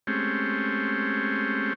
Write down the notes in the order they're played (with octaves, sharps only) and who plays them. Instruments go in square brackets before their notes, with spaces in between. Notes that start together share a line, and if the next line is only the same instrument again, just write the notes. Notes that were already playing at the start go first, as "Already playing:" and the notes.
[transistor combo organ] G#3 A3 C4 C#4 G4